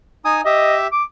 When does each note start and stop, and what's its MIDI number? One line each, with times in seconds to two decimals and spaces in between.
0.25 0.41 63
0.25 0.41 80
0.25 0.41 87
0.45 0.87 67
0.45 0.75 75
0.45 0.87 76
0.92 1.03 86